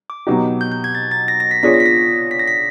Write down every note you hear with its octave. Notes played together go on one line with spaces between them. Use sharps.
D6
B2 F#3 B3 D#4 G4
G6
G6
G#6
A6
A6
A#6
A#6
B6
B3 D4 F4 G#4 C#5 B6
A#6
B6
A#6
B6
A#6
B6